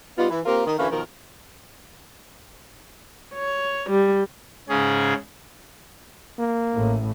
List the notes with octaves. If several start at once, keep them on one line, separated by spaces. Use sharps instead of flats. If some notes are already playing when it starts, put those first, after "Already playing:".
G3 B3 D#4 F4
E3
A#3 C4 F4 G4 A#4
D#3
D2 E3 A3 C#4 A#4 F5
B2 D#3 F3 A#4
C#5
G3
G#2 C#3 C#4 G#4
A#3
A1 A2